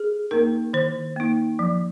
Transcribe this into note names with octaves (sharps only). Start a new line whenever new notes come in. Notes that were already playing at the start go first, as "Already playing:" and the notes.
Already playing: G#4
A#3 D#4 A#4
D#3 C5
A#3 D#4
F3